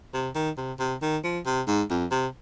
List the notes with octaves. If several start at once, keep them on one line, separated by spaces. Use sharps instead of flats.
C3
D#3
C3
C3
D#3
F3
C3
G#2
F2
C3